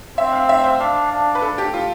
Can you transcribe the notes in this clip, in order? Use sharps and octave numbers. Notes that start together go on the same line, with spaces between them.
C4 E5
F5
E5
C5
D4 F5
D4
B4
A4
G4
F4